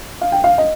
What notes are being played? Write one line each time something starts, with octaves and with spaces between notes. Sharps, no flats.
F5
G5
F5
D#5